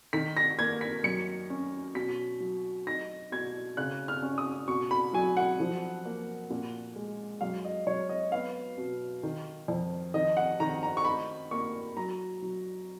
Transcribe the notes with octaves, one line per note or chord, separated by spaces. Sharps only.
D#3 B6
A#6
A#3 G#6
B6
F#2 C#7
C#4
B2 B6
F#3
D#4 A#6
B2 G#6
C#3 F#6
F6
C#4
D#6
B2 C#6
B5
F#3 G#5
F#5
F3
A#3
A#2
G#3
F#2 F5
D#5
F#2 C#5
D#5
B3 F5
B2
D#3
F2
D#3 D#5
F#5
D#3 A#5
A#5
C#6
D#4 B5
A#3 C#6
F#3 A#5
F#3